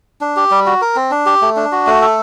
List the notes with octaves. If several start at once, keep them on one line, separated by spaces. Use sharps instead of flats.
D4
G4
G3
F#4
A#4
C4
D4
G4
A3
D4
F#4
A3
A4